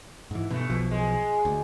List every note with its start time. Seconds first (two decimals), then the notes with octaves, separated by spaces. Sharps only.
0.31 G#2 E3
0.50 G2 B2 A3
0.70 B1 B2 F3
0.91 G#3
1.45 D2